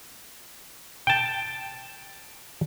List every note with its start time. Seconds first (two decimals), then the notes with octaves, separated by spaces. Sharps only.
1.07 G5 A5